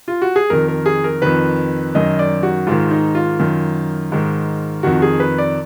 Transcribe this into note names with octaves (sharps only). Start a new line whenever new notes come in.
F4
F#4
G#4
F2 D#3 A#4
A#4
G#4
A#4
F2 D#3 B4
F#2 D#3 D#5
D5
F#4
G#2 D#3 F4
D#4
F4
F#2 D#3
G#2 D#3
F2 D#3 F#4
G#4
B4
D5